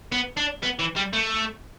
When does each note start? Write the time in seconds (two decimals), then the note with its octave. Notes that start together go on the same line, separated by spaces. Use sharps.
0.12 B3
0.37 D4
0.63 B3
0.79 E3
0.96 G3
1.13 A3